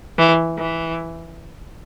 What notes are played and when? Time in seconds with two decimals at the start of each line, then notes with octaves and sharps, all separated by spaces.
0.18 E3
0.57 E3